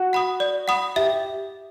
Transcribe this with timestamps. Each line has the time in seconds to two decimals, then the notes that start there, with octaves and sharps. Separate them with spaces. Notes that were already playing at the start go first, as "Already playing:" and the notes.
Already playing: F#4
0.13 F#5 B5 D#6
0.40 D5
0.68 F#5 B5 D#6
0.96 G4 E5